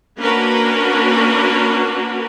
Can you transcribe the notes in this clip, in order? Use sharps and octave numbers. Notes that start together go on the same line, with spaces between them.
A#3 C#4 D4 F#4 A#4 B4